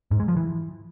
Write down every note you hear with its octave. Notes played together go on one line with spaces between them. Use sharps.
G#2
G#3
F3
E3